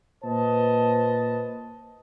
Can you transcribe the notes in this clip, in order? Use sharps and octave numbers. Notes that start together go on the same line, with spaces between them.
A#2 B4 C5 D#5 A5